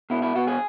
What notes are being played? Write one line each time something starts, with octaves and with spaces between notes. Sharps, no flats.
B2 E4
E4
B2 F#4
G#4